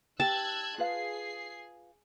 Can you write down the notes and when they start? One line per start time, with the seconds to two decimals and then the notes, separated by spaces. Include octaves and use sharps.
0.20 G4 A5 E6 F#6 G#6
0.78 F4 G#4 B4 F5 C7